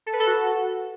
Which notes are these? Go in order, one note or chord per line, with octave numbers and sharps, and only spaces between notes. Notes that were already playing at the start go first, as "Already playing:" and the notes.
A4
B4
A4
F#4